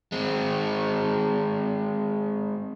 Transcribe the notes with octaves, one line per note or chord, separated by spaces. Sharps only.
G#3 C4